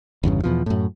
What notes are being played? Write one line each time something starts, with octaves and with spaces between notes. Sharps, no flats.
G1 E2 G2 C#3
E2 B2 F3
F#2 A2